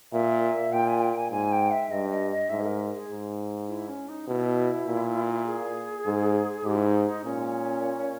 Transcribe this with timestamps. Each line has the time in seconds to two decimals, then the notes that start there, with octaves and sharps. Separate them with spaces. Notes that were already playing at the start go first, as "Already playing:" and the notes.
0.13 A#2 E5
0.72 A#2 G5
0.88 G#5
1.02 G5
1.12 G5
1.17 G#5
1.31 G#2 G#5
1.52 G5
1.71 E5
1.91 G2 D#5
2.10 D#5
2.31 D#5
2.50 G#2 E5
2.61 G#4
2.66 A#4
2.95 G#4
3.09 G#2
3.68 E4
3.88 C#4
4.09 D#4
4.28 B2 E4
4.87 A#2
5.46 G#4
6.06 G#2
6.65 G#2 G4
6.75 E4
6.86 D#4
7.05 D#4
7.25 A#2 C#4